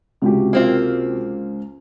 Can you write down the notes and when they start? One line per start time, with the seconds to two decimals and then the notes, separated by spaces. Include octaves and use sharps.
0.22 C#2 C3 F#4 G4
0.53 A#3 C4 F4